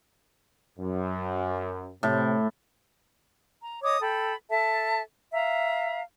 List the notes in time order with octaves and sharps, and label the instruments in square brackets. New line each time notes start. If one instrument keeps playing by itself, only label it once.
[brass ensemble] F#2
[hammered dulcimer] A2 [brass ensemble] C3
[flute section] A#5
C#5 D#5 D6 D#6
A4 G5 B5
A4 E5 A5
E5 F5 A#5